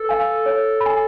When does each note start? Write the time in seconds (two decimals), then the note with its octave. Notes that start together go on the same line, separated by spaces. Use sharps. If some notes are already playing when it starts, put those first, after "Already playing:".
Already playing: A4 B4
0.09 F5 G#5
0.46 C#5
0.81 B5
0.86 G#5